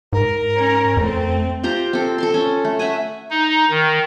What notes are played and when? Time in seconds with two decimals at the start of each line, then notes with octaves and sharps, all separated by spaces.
0.13 G#2 A#4
0.57 C#4
0.97 F2 A3 C4
1.63 F4 G4 C5 A#5
1.93 C4 A4
2.18 A4 A5 C6
2.34 C#4
2.65 A3
2.79 E5 F#5 G#5
3.30 D#4
3.70 D#3